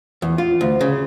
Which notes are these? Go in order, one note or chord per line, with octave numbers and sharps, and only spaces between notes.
E2
F4
D2
C#3